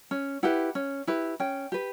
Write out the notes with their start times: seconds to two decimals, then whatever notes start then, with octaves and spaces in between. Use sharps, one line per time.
0.11 C#4
0.43 E4 G4 B4 F#5
0.75 C#4
1.07 E4 G4 B4
1.40 C#4 G5
1.72 G4 B4